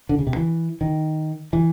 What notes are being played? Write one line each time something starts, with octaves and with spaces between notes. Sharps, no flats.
D3
C#3
C3
E3
D#3
E3